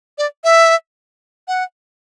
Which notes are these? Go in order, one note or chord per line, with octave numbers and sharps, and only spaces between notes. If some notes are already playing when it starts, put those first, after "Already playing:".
D5
E5
F#5